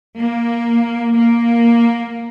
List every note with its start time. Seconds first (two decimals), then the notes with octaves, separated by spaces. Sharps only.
0.19 A#3
1.15 A#3